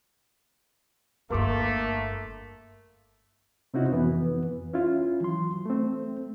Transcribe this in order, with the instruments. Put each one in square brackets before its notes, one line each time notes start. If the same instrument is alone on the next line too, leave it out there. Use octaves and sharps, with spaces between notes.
[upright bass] G1 G2 [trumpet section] A3 [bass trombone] A#3 [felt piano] A#4 C6 D6
[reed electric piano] C3 C4 C#4 D#4 E4 F#4
F2 E3 B3 B4
C#4 E4 F4
E3 F#3 C6
A3 C4